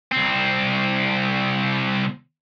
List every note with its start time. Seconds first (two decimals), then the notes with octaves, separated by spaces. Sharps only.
0.11 C2 C4